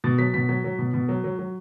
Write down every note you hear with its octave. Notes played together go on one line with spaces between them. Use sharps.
B2 A6
F#3 B6
B2 B6
F#3 B6
F#3
B2
B2
F#3
F#3
F#3